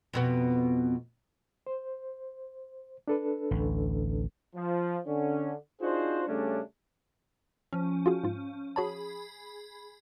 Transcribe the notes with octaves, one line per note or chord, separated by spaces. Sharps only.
F2 B2 B3
C5
D4 A4 B4
A1 D2
F3
D3 C#4
D4 D#4 F4 F#4 G#4 C5
C#3 G3 A3 C#4 D4
F3 C#4
F4 F#4 G#4
G#2 F4
F#4 G#4 C#5 A5 B5